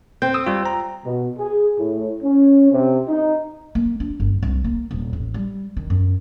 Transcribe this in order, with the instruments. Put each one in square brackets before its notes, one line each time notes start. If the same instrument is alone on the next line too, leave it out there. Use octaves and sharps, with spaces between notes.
[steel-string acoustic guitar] C4 [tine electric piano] G6
[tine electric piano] D#6 E6
G3 F4
A#5
[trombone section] B2
G#4
A2
C#4
C3
D#4
[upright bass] A#3
D4
G1
C2
A#3
D#1
A1
G3
D#3
F#2